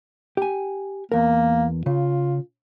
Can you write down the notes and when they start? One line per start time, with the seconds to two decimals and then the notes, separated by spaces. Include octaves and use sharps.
0.37 G4 G#5
1.12 E2 A#3 A#4
1.86 C#3 F4